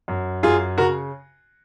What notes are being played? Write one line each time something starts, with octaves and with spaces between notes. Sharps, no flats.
F#2
F#2 F4 G#4
C#3 F#4 A#4